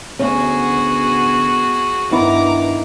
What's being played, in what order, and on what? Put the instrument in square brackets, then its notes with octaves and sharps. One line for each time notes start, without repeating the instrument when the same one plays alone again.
[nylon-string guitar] D2 C#4 [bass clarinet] B3 [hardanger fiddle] F#4 G#4
[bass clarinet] G2 [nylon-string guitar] D#3 B3 E4 [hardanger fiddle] A#5 D6